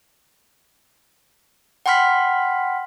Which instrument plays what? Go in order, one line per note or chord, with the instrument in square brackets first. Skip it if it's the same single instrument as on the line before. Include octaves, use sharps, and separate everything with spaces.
[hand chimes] F#5 G5 B5 C6 F6 B6